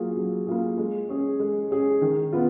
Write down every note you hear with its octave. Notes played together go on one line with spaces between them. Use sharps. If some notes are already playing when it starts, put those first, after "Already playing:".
Already playing: F#3 A#3 F4 G#4
F#3
A#3 F4 G#4
G#3
C#4 G#4
G#3
C#4 G#4
D#3
B3 F4